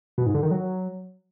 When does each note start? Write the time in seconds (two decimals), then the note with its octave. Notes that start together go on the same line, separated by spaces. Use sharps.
0.18 B2
0.26 G#2
0.34 D3
0.43 D#3
0.51 F#3